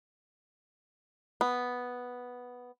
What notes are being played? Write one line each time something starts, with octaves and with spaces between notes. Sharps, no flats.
B3